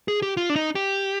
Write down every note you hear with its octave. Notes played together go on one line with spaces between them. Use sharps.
G#4
G4
F4
D4
D#4
G4